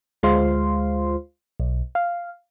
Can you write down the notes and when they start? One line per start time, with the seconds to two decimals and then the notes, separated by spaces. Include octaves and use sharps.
0.23 D2 G#3 F4 C5 F5 C6
1.60 B1
1.95 F5